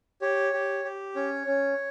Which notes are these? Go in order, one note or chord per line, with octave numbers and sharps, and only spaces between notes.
G4 C#5
G4
G4
C#4 C#5
C#4